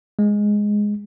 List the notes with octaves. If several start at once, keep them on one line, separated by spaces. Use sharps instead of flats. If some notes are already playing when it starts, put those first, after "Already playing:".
G#3